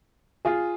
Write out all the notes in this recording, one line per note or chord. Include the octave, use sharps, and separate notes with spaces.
F4 G#4